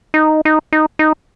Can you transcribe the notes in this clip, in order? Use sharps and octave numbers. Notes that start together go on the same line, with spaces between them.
D#4
D#4
D#4
D#4